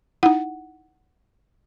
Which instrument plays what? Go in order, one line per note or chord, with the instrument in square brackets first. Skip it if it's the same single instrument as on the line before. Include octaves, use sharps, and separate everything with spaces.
[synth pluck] D#4 E4 [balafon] F#5